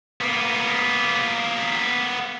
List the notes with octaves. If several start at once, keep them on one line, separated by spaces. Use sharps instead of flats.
A#3 B3